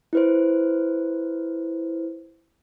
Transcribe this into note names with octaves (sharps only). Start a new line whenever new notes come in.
E4 B4 C5